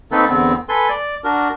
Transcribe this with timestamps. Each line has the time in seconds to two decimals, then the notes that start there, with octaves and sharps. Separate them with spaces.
0.12 D#3 A#3 C4 D#4 A4 B4
0.29 E2 D3 B3 C4
0.69 A4 B4 G#5 C6
0.90 D5
1.24 D4 F#4 A#4